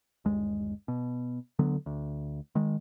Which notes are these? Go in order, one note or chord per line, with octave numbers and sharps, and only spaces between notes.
G1 D#2 G#3
B2
D2 D3 F#3 B3
D2
D#3 G#3